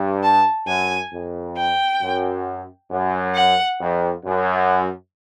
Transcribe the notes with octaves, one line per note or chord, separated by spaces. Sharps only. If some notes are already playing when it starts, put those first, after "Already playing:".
Already playing: G2
A5
F#2 G#5
F2
G5
F#2
F#2
F#5
F2
F#2